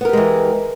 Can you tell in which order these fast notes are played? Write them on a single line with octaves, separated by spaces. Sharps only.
B3 A#4 G4 G#3 E3